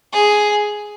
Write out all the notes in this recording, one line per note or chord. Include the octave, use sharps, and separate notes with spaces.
G#4